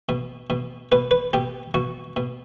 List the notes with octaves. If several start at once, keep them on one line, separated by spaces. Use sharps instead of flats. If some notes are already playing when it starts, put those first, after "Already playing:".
B2
B2
B2 B4
B4
B2 G4
B2 F#4
B2